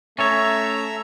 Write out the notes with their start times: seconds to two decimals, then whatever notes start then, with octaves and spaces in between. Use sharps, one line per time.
0.19 A3 C#4 A4 C#5 E5 A#5